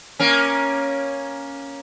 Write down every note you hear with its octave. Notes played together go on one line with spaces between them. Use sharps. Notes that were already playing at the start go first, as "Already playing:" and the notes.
A#3 C#4